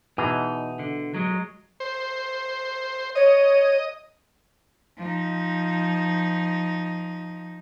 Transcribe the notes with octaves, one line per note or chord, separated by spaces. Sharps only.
B2 E3 D#4 G#4
D3
F#3 G#3
C5
C#5 D#5
F3 D#4